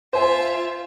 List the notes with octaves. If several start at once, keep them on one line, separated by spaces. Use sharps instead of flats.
F4 C5 E5 G#5